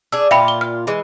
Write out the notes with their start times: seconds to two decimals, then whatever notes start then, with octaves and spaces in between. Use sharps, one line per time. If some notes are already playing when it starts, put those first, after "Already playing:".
0.12 D4 G#4 E6
0.31 A#2 F4 E5 G5 B5
0.48 G7
0.61 F6
0.87 E3 G#3